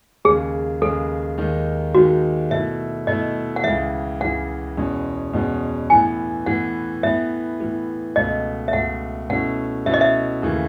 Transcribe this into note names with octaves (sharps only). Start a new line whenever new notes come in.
D#2 C#3 G#3 G#4
D#2 C#3 G#3 A4
D#2 D#3 G#3 D#4
D#2 D#3 G#3 D#4 F#4
B2 A3 E4 E5
B2 A3 E4 D#5
F#5
C#2 C#3 E3 E5
C#2 C#3 E3 F#5
E2 B2 G#3 C#4
E2 B2 G#3 C#4
A2 E3 B3 G#5
A2 E3 B3 F#5
A2 E3 B3 E5
A2 E3 B3
C#2 B2 A3 D#5
E5
C#2 B2 A3 F#5
B2 A3 C#4 E4 F#5
B2 A3 C#4 E4 E5
D#5
E5
D#2 C#3 E3 A3